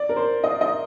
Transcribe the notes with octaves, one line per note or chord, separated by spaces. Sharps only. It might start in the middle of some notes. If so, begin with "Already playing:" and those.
Already playing: D5
A#4
C5
D#5
D#5